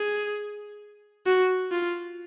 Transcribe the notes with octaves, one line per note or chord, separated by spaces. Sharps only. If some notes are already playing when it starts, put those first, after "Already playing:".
Already playing: G#4
F#4
F4